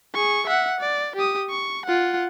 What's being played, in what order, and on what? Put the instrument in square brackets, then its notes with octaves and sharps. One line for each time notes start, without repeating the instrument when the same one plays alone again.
[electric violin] G#4 C#6
E5 F#5
D5
G4 D#6
C#6
F4 F#5